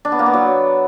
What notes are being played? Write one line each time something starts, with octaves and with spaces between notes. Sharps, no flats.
D4
B3
A#3
B3
F#3